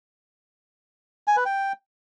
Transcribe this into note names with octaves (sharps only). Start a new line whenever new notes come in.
G#5
B4
G5